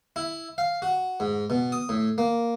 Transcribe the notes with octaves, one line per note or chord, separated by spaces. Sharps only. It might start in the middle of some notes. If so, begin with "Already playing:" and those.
E4
F5
F#4
G#2
B2
D#6
A2
A#3